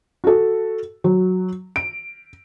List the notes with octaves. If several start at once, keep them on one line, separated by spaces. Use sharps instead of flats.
F#4 A4
F#3
D7